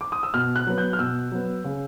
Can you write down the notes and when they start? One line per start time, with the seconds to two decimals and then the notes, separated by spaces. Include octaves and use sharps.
0.01 D6
0.12 D#6
0.23 E6
0.34 B2 F6
0.56 F#6
0.67 F#3 B3
0.78 G6
0.93 F6
0.99 B2 E6
1.32 F#3 B3
1.64 C#3